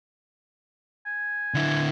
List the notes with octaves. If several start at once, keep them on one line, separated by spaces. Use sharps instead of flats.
G#5
D3 E4